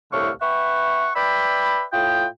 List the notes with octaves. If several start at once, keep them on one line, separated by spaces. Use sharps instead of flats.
C2 A2 D3 A3 F5 C#6
B4 E5 F#5 G5 C#6
B4 D5 E5 G5 B5
A2 F4 D#5 G5